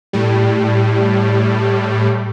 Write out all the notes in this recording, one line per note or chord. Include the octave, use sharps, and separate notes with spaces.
A2 G3